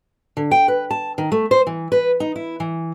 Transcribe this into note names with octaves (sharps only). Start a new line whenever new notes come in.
D3
G5
B4
A5
D#3
A3
C5
E3
B4
D#4
E4
E3